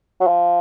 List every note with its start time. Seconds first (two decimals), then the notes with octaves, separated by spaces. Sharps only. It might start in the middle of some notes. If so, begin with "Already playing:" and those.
0.21 F#3
0.27 F3